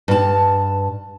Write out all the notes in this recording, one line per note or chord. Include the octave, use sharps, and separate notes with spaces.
G2 A5